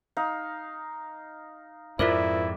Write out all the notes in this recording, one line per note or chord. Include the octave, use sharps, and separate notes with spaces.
D#4 F5
F2 G#2 E4 F4 A#4 C5 D5